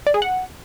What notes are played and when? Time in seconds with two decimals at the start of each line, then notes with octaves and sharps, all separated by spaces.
0.07 D5
0.14 G#4
0.22 F#5